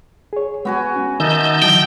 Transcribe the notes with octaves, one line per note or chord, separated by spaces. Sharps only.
G#4 C#5
G#3 B3 F#4 G#5
C#4
D#3 D#4 D#5 E5 A5 G6
D3 E3 F#3 G5